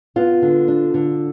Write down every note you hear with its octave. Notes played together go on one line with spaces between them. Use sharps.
B3 F4
D3
D4
D3